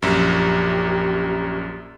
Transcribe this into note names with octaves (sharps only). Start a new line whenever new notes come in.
A#1 F#2 G4